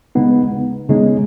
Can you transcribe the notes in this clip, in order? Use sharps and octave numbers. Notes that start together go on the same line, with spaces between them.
C#3 G#3 B3 D#4
C#3 G#3 B3 D#4